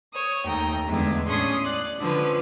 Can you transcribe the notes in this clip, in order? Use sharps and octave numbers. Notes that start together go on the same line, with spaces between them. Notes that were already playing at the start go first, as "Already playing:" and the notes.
C#5 D#6
D#2 A3 G5 A#5
E2 D3 G#3 A3
A2 C#4 D4 G#4 C6 D#6
D5 F#6
D3 F3 C#4 B4